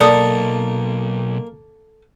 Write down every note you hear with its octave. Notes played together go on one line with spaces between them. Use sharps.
B1 A#3 A4 D5 D#6